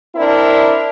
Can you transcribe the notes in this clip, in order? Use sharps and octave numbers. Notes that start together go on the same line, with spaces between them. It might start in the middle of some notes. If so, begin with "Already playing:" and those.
C4 D4 E4 A#4